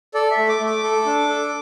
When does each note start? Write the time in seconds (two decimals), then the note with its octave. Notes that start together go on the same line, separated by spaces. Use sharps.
0.14 A4 D5
0.31 E5
0.37 A3
0.48 D6
0.60 A3
0.66 D6
0.83 A4
1.06 D4
1.29 A4